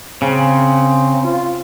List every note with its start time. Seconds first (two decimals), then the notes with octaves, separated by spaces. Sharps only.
0.22 C#3 C4
1.24 F4